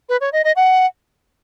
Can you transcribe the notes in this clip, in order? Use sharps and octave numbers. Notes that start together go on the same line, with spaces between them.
B4
C#5
D#5
D#5
F#5